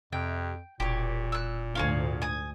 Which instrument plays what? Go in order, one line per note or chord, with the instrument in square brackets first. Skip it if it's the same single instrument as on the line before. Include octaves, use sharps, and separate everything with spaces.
[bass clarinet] F2 [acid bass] C3 [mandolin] G5
[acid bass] E1 [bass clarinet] A#2 [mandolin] G4 C#5
[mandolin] E6 F#6
[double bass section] D2 G#2 D3 [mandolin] G#4 C#5 F5
[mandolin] G#5 D#6